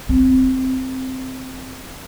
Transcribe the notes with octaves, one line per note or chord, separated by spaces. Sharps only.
C4